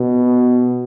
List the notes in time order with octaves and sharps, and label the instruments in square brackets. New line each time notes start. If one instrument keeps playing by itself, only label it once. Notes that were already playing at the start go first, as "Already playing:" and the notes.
Already playing: [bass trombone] B2